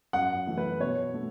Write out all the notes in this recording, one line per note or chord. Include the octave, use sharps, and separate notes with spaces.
F#2 F#5
E3 A3
B4
B2 C#5
A3